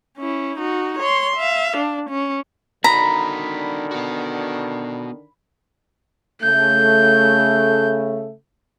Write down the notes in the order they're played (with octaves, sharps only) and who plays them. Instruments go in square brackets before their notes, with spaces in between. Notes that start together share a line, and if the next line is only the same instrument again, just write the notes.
[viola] C#4 E4
D#4 F#4
C#5 C6
E5 F5
D4
C#4
[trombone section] D3 D#3 D4 [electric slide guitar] D#4 F#4 [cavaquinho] A#5 [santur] B5
[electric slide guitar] B3 F#4
[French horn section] C#3 A3 [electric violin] G6